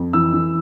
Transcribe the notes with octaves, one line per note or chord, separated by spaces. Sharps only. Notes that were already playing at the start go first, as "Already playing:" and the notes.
Already playing: F2
E3 E6
E3